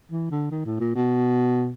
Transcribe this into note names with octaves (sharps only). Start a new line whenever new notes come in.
E3
D3
D#3
A2
A#2
B2